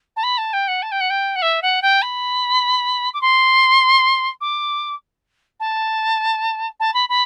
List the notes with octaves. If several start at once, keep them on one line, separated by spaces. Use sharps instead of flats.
A5
B5
A5
G5
F#5
A5
G5
F#5
G5
F#5
E5
F#5
G5
B5
D6
C6
D6
A5
A5
B5
B5